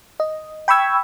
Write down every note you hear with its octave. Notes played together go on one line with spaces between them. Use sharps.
D#5
G5 B5 C#6 E6 G#6